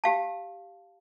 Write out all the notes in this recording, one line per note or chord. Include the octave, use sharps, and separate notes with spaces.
G4 F5 A5